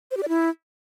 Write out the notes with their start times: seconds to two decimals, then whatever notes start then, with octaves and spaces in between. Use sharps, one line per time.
0.11 C5
0.17 G4
0.23 D5
0.29 E4